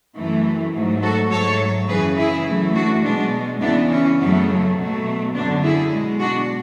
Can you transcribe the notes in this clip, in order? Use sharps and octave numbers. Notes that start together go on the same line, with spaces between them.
F#2 E3 A3
G#2 F#3 A3
F#4 A4
G#2 F#3 A3 A4 C#5
F#2 C#3 E3 G#4 B4
E4 G#4
F#2 E3 A3
D4 F#4
B2 G#3 B3 D4
E2 C#3 E3 B3 D4
C#4
F#2 C#3 F#3 A3 B3
B2 F#3 A3
F#2 D3 F#3 B3 D4
E4 G#4
B2 G#3
D4 F#4